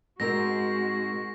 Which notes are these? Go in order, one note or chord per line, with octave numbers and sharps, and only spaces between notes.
G#2 G#3 C4 F#4 A#4 A#6